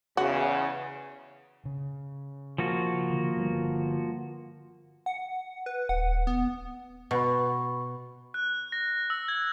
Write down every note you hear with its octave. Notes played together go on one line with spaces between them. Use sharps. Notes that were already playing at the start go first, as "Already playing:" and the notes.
E2 C#3 F#4
C#3
F3 A#3 F#4
D3 D#3
D3 G3
F#5
B4
D#1 F#5
B3
B2 B5 C#6
F#6
A#6
E6
G#6